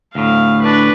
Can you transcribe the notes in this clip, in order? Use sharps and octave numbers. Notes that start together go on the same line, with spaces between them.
D2 A2 F5
D4 B4